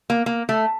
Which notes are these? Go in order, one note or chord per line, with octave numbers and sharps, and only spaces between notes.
A#3
A#3
A3